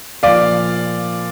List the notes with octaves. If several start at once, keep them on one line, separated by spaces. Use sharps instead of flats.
A#2 F3 D5 F5